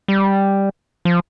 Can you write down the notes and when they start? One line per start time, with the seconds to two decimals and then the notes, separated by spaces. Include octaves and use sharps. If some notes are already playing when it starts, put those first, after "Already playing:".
0.08 G3
1.05 F3